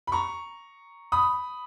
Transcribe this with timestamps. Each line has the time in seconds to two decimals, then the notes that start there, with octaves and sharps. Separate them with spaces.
0.07 B5
0.12 A#5 C#6
1.12 B5 D#6